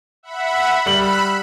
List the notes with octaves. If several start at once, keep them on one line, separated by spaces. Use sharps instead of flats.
E5 F#5 B5
G3 B5 E6 F#6 F#7